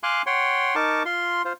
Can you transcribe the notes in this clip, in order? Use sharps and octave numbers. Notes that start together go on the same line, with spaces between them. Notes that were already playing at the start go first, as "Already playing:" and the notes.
F5 G#5 C6 D6 F#6
C#5 F#5 G5 C6
D#4 A#4 A5 C#6 D6
F4 C6
F4 C5